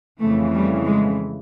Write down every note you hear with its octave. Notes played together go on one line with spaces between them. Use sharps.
F2 C#3 E3 A3
G3
G#3